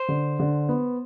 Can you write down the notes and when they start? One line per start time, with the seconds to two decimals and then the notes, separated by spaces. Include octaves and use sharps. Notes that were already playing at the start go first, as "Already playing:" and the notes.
Already playing: C5
0.08 D3
0.39 D3
0.69 B3